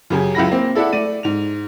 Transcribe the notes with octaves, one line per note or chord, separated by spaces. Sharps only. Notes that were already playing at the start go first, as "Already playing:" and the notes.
F#2 C#3 G4 G#5
C#2 F#2 E4 B5 A#6
A#3 C4
E4 A4 D5 E5 F#5
A3 D5 D#7
G#2 F7